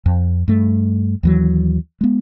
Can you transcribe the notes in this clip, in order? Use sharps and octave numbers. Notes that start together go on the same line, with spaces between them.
F2
G2 A3
D#2 E3 F#3
G#3 B3